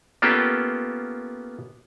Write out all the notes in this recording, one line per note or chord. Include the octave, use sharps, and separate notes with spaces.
A#3 B3 C#4 F4 G4 A4